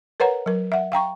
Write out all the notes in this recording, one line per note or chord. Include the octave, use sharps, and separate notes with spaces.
A#4 B4 C#5 F#5 A#5
F#3 A#4
E5 F#5
F5 G5 A#5 C#6